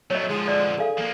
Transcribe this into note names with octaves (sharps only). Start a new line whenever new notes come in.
F#3 A3 C#5 D#5
D3 F3 G#3
D5
G#4 A4 F5
F3 A#3